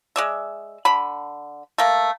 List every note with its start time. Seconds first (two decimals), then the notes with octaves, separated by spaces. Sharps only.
0.16 G#3 D5 E5
0.85 D3 B5
1.78 A3 A#3